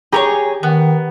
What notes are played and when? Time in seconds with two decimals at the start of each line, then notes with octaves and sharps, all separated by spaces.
0.13 G4 G#4 A#4 C#5 A#5
0.63 D#3 B3